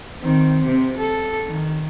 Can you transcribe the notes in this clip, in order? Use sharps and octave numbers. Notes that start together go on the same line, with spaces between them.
D#3 C4
C3 C4
A4
D#3